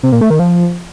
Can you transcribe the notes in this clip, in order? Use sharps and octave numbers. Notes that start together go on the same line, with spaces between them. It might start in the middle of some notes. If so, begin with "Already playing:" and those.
C3
A#2
A3
D#3
F3